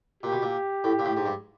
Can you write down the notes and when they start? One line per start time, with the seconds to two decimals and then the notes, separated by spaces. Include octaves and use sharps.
0.23 A#2 G4
0.32 B2
0.42 A#2
0.84 A2
0.99 A#2
1.05 A2
1.17 G#2
1.26 G2